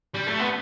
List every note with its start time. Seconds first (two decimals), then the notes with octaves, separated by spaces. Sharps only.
0.14 G3
0.27 A3
0.39 B3